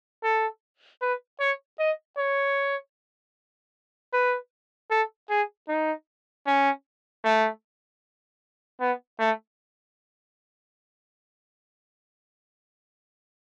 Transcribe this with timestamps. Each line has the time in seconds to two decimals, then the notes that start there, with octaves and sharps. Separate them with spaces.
0.23 A4
1.02 B4
1.40 C#5
1.79 D#5
2.18 C#5
4.13 B4
4.91 A4
5.30 G#4
5.69 D#4
6.47 C#4
7.25 A3
8.80 B3
9.19 A3